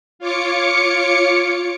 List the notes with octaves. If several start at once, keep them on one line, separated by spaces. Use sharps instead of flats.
F4 C#5 D6 C#7